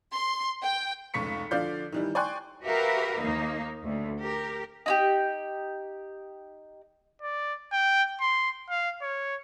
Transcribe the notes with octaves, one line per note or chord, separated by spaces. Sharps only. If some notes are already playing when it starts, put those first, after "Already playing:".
C6
G5
F1 C#2 C#6 B6 C#7
D3 F3 D5 F5 G6
D#3 E3 G3
D5 G5 G#5 C6 C#6 F#6
F#4 G4 A#4 B4 E5 F5
D#2 A#3 D#4
D2
G4 A#4
D#4 E4 G4
D5
G5
C6
F5
C#5